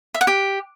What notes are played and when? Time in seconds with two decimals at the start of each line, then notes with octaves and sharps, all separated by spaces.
0.14 E5
0.21 F#5
0.27 G4